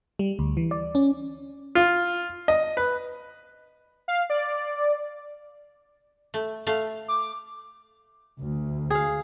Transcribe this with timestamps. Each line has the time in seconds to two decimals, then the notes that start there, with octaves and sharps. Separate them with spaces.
0.19 G3
0.39 D2
0.57 E3
0.71 D5
0.95 C#4
1.75 F4
2.48 D#5
2.77 B4
4.08 F5
4.30 D5
6.34 A3
6.67 A3 F5
7.08 D6
8.40 D2
8.90 G#4 F5